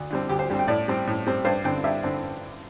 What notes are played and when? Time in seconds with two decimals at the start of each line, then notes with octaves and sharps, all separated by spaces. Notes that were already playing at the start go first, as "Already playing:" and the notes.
Already playing: D2
0.10 D3 G3 C4
0.29 D2 G4
0.39 C5
0.50 D3 G3 C4
0.59 G5
0.68 A2 D5
0.88 G3 C4
1.07 A2
1.27 G3 C4
1.45 G2 C5
1.64 D3 C4 G5
1.84 G2 E5
2.03 D3 C4